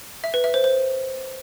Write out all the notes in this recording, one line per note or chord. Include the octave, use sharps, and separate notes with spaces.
E5
B4
E5
C5
C5